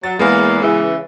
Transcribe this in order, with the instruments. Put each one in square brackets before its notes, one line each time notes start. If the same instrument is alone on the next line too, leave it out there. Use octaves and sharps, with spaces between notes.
[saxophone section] F#3 [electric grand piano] A6
[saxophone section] E2 A#3 [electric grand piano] G#3 B3
[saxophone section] C#3 E3